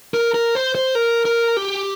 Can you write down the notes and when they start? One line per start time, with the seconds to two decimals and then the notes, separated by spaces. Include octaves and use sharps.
0.14 A#4
0.34 A#4
0.55 C5
0.75 C5
0.95 A#4
1.25 A#4
1.57 G4